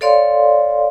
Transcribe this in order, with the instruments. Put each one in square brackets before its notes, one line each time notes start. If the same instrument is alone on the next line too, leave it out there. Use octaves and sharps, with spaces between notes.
[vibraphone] A4 C#5 D5 F5 C6